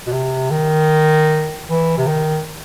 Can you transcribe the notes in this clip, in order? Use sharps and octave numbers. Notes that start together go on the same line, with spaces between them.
B2
C3
D#3
E3
C3
D#3